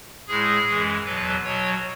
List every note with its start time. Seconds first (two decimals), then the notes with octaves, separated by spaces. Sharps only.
0.28 A2 G#3 G#4
0.67 F#2 E3 G#3
1.05 E2 B2 F#3 B4
1.44 B2 F#3 C#5